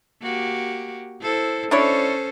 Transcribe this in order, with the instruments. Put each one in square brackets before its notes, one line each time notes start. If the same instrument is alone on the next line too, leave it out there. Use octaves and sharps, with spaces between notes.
[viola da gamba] A#3 F#4 G4
E4 A4 C5
[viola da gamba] C#4 A4 C5 [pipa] D4 E4 C#5